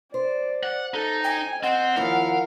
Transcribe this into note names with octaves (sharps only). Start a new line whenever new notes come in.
C5 D5
F#5
D#4 A4
G5 G#5
C4 D#5 F#5
D#2 F3 E4 A#4 F5